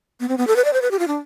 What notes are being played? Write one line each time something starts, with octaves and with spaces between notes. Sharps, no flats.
B3
C4
B3
A4
B4
D5
C5
B4
G4
F4
D4